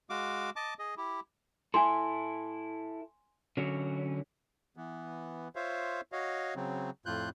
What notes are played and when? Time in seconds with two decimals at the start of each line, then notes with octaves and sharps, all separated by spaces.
0.10 G#3 F#4 F5 D6
0.56 D#5 A5 D6
0.79 G#4 D#5
0.97 E4 G4
1.74 E4 A4 G#5 C6
3.57 D3 F#3 C#4
4.76 E3 B3
5.56 F4 C5 C#5 E5 F5
6.12 F#4 C#5 D#5 F5
6.56 C#3 F#3 C4
7.06 F2 A2 F4 F#6 G6